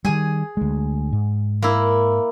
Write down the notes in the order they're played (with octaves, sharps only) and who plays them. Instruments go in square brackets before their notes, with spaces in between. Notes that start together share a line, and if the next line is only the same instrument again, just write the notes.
[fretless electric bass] D#3 G3 [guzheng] G#4 G#5
[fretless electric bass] D2 G#3
G#2
[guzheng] A#3 E4